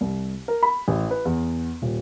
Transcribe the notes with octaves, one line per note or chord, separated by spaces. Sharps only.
C2
A#4
B5
A1
B4
E2
D#1